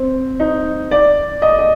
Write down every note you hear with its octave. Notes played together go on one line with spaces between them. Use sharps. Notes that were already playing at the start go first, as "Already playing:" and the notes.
Already playing: C4
D#4
D5
D#5
D#5